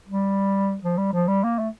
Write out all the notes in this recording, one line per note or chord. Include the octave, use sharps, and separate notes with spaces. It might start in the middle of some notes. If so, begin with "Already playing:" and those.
G3
F3
G3
F3
G3
A#3
A3